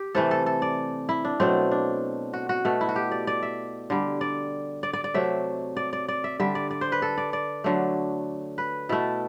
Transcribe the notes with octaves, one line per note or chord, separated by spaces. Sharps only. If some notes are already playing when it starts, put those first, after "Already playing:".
Already playing: G4
C3 E3 A3 A4
A4
A4
D5
E4
D4
B2 F#3 A3 C4
D4
F#4
F#4
B2 A3
E4
F#4
G4
D5
D5
E5
D3 G3
D5
D5
D5
D5
C3 F#3 A3 E5
D5
D5
D5
E5
D3 G3 E5
D5
D5
C5
B4
A4
D5
D5
D3 F#3 A3
B4
B2 A3 E4